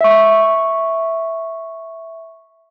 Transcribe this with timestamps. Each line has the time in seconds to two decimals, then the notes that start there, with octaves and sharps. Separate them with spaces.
0.01 E5 C#6